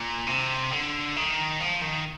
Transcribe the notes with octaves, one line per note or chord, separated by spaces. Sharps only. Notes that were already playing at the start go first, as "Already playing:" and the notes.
Already playing: A#2
C3
D3
D#3
F3
D#3